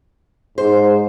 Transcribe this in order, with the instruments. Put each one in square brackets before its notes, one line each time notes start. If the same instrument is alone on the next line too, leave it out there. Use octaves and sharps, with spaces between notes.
[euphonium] G#2 [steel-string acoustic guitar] C5